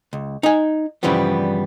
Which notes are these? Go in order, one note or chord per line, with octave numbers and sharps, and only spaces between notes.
C#2
D#4 G#5
G2 C#3 E3 F3 G3 B3